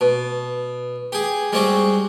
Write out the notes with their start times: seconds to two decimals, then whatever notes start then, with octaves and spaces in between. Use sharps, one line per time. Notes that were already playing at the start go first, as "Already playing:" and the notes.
0.01 B2
1.12 G4 G#4
1.52 G3 G#3 C4 F#4 G4